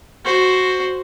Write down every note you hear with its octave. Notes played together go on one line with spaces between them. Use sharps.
F#4 C5